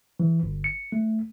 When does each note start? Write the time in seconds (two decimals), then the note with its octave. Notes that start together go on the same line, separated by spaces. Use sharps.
0.20 E3
0.43 G1
0.64 C#7
0.92 A3